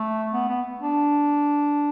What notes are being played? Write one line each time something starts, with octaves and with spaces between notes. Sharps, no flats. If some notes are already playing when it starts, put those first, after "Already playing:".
Already playing: A3
B3
B3
D4